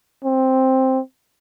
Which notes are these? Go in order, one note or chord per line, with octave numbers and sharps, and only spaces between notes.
C4